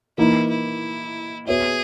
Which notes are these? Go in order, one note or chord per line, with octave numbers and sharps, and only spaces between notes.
E3 A#3 D#4 E4
E4
B3 F#4 G#4 C#5 E5